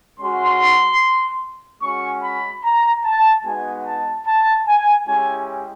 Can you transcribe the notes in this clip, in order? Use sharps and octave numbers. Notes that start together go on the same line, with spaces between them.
G#3 C#4 F#4 C6
G#3 C#4 F#4 C#6
B5
A#5
A5
G#3 B3 D#4 F#4 G#5
A5
A5
G#5
G#3 C#4 E4 G4 G#5